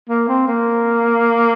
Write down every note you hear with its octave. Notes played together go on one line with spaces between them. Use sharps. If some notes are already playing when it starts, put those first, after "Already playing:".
A#3
C4
A#3